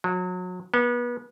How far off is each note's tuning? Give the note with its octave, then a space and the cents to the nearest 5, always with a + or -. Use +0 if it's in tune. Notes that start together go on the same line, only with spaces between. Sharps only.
F#3 -30
B3 -30